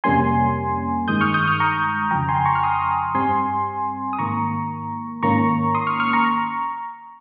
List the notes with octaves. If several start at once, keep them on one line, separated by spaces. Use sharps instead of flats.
F2 C3 G3 A#3 C#4 G#5 C6
G2 D#3 G#3 D#6 G6
C#6 F6
D#6 G6
C#6 F6
A#5 C#6
F2 C#3 F3 G5 A#5
G#5 C6
A#5 C#6
F6
C6 D#6
G2 G3 C4 G#5 C6
D#6
G#2 D#3 A#3 A#5 C#6
G#2 D#3 A#3 C#4 A#5 C#6
C6 D#6
C#6 F6
C#6 F6
A#5 C#6